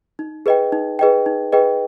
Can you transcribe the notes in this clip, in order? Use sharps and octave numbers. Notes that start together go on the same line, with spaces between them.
D#4
G#4 B4 D#5 G5
D#4
G#4 B4 D#5 G5
D#4
G#4 B4 D#5 G5